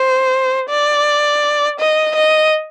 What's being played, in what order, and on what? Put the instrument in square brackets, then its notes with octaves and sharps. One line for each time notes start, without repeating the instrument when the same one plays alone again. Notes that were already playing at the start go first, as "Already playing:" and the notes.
Already playing: [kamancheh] C5
D5
D#5
D#5